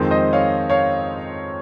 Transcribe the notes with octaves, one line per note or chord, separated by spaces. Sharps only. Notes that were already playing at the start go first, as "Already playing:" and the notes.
Already playing: F2 D#3 G#3 C4
C5 D#5
C#5 F5
C#5 F5